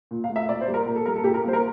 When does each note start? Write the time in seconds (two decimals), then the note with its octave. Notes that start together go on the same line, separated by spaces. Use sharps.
0.11 A#2
0.24 F5
0.29 A3
0.36 E5
0.49 A#2 D5
0.61 C5
0.68 G3 A#3
0.74 A#4
0.86 A#2 A#4
0.95 A4
1.06 G3 A#3 A#4
1.16 A4
1.24 A#2 G4
1.34 A#4
1.44 G3 A#3 C5
1.53 A#4